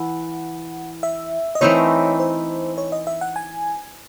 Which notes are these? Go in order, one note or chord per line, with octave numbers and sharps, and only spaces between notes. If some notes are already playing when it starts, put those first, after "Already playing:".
Already playing: E3 F#5
E5
D#5
E3 A3 C4 D#4 C#5
C5
C#5
D#5
E5
F#5
G#5